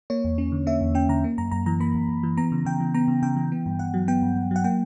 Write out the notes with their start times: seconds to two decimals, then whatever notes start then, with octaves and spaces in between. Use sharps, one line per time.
0.10 A#3 C#5
0.24 E2
0.38 C#4
0.52 D3
0.67 A#3 E5
0.81 E2
0.95 C#4 G5
1.09 D3 A#5
1.24 A#3
1.38 F#2 A#5
1.51 F#2 A#5
1.66 E3 A#5
1.80 A#3 B5
1.95 F#2
2.09 F#2
2.23 E3
2.37 B3 A#5
2.52 C#3
2.65 C#3 G5
2.80 E3
2.94 B3 A#5
3.08 C#3
3.22 C#3 G5
3.36 E3
3.52 B3
3.66 G2
3.79 G2 F#5
3.94 F#3
4.08 B3 G5
4.22 G2
4.36 G2
4.51 F#3 F#5
4.64 A#3 G5